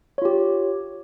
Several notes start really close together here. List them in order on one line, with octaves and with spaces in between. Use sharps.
C#5 F4 G4